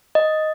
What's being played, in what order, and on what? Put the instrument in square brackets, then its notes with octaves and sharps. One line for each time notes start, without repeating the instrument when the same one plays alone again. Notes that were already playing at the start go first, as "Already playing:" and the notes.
[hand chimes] D#5